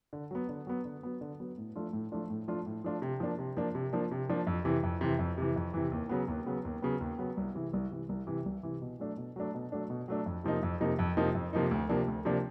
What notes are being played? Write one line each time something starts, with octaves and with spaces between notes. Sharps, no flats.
D3
F#3 B3
D3
F#3 B3
D3
F#3 B3
D3
F#3 B3
A2
F3 A3 D4 F4
A2
F3 A3 D4 F4
A2
F3 A3 D4 F4
A2
F3 A3 D4 F4
C3
F3 A#3 D4
C3
F3 A#3 D4
C3
F3 A#3 D4
C3
F3 A#3 D4
F2
C3 E3
F2
C3 E3
F2
C3 E3
F2
C3 E3
D#2
C#3 F#3 B3
D#2
C#3 F#3 B3
D#2
C#3 F#3 B3
D#2
C#3 F#3 B3
C2
C3 E3
C2
C3 E3
C2
C3 E3
C2
C3 E3
B2
F#3 A3 D4
B2
F#3 A3 D4
B2
F#3 A3 D4
B2
F#3 A3 D4
F2
C3 F3 A#3 D#4
F2
C3 F3 A#3 D#4
F2
C3 F3 A#3 D#4
F2
C3 F3 A#3 D#4
D2
C3 F3 A#3 D4
D2
C3 F3 A#3 D4